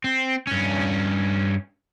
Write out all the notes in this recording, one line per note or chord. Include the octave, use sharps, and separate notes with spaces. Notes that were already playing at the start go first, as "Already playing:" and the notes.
C4
G2 C#4